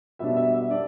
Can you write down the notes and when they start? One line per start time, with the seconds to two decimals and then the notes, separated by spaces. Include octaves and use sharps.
0.19 B2 G3 D4 E5
0.36 E5
0.54 E5
0.70 G3 D4 D5